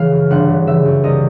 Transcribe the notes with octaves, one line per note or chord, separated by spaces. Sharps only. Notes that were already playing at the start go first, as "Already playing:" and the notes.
Already playing: C#3 E3 F5
F#2
G1 F#5
C#3
E3 E5
F#2
C2 D#5